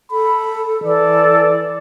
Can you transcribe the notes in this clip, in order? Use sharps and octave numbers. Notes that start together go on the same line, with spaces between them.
A4 B5
E3 A4 D5